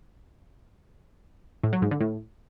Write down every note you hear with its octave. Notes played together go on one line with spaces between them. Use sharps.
A2
F#3
G#2
D3
A2